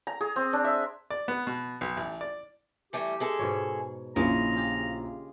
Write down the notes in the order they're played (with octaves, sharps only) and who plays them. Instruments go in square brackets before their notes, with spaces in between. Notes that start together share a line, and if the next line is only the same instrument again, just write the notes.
[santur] A#5
G#4
C4
D4
E5
[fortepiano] D5
B3
B2
B1
A1
D5
[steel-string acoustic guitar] E3 G3 A3 [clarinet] G4
[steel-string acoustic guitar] G#3 G#4 A4
[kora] G#2 B2 C#5
[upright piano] A#1 E4 [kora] C#3 [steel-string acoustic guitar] G#3 [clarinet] A#5
[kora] F4 G4